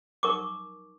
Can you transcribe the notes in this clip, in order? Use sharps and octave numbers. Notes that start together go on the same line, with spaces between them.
D#4 A#4 C#6 D6